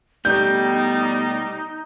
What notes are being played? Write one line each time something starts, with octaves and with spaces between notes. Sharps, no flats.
B2 G3 A3 B3 D#4 G6